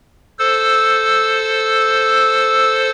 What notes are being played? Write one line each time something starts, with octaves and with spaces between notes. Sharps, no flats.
A4 C5 E6